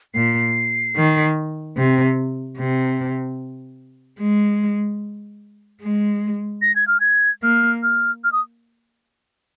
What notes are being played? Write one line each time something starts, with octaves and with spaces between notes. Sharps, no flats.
A#2 C7
D#3
C3
C3
G#3
G#3
A#6
G#6
F6
G#6
A#3 F6
F6
F6
D#6